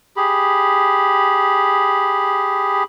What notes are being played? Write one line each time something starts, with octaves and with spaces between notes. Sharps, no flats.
G4 G#4 B5